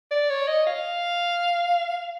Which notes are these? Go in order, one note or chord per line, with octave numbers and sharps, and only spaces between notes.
D5
C#5
D#5
F5